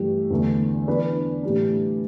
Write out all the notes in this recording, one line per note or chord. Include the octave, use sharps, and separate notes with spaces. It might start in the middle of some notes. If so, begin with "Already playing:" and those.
Already playing: G2 E3 A3 G4
E2 D3 A3
E3 B3 D4 B4 D5
A2 E3 G3 D4